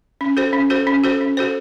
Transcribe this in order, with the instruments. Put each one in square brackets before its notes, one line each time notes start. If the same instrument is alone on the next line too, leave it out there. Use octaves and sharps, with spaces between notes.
[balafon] C#4
F#4 A4 C5
C#4
F#4 A4 C5
C#4
F#4 A4 C5
C#4
F#4 A4 C5